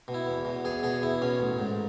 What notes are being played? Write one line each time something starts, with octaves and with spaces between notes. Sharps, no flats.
B2
E4
E2
B2
E2 G#4
B2 G#4
E2 E4
B2 C#4
A1
G#2